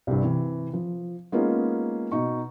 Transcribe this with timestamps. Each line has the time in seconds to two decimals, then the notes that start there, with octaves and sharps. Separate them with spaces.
0.07 C2 G2
0.23 C3 E3
0.73 F3
1.32 G#3 A#3 B3 C#4 D#4 F4
2.12 B2 D#4 C#6